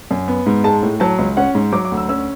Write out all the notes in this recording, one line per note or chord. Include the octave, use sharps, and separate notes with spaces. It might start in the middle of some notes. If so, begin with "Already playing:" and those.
F#2
B3
G#2
G#3 A5
A2
F#3 A5
C#2
C#4 F#5
G#2
F#3 D6
D6
D2
E6
C#4 E6